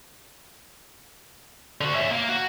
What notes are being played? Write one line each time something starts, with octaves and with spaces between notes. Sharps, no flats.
D3 F#4
C#4 E5
A#3
F#4